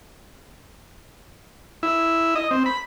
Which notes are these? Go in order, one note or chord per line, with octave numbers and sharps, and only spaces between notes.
E4
D#5
C4
B5